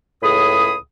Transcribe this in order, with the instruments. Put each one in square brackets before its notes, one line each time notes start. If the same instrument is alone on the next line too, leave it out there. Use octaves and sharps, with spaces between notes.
[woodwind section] C#2 A2 G#4 B5 D#6